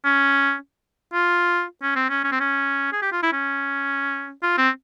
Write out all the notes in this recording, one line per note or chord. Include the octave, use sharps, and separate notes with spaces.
C#4
F4
C#4
C4
C#4
C#4
C4
C#4
G#4
G4
F4
E4
C#4
F4
C4